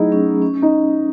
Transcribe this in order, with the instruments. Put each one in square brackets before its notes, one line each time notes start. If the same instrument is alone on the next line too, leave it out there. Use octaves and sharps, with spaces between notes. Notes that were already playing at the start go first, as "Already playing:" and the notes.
Already playing: [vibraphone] F#3 A3 G#4 [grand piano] D#4 E4
[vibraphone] C#4
C#4
[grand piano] D#4